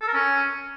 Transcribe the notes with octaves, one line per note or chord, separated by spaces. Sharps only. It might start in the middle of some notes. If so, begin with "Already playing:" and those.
A4
A#4
C#4